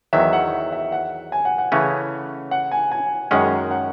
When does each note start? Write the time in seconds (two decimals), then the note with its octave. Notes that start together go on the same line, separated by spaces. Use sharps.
0.13 E2 D#3 F#3 E5
0.33 F#5
0.72 E5
0.92 F#5
1.32 G#5
1.45 F#5
1.58 F#5
1.72 C#3 E3 A3 C#4
2.51 F#5
2.71 G#5
2.91 G#5
3.31 F#2 D#3 G#3 C#4 F#5
3.71 F#5